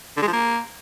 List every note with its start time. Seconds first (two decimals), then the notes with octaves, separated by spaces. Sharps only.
0.17 D3
0.22 G#3
0.28 F3
0.33 A#3